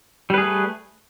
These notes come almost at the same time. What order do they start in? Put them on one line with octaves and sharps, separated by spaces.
G3 B4 G#4 A3